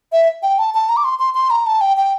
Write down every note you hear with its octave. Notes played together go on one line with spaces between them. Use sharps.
E5
G5
A5
A5
A#5
D6
C6
C6
C6
A#5
A5
G5
G5